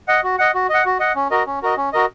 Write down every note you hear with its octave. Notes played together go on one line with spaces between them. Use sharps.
D#5 F#5
F#4
D#5 F#5
F#4
D#5 F#5
F#4
D#5 F#5
C#4
F#4 A#4 D#5
C#4
F#4 A#4 D#5
C#4
F#4 A#4 D#5